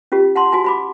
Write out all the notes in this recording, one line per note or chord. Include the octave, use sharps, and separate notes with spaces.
C#4 F4 G4
F#5 A5 C6
F#4 G#5 A5
F#4 B5 D6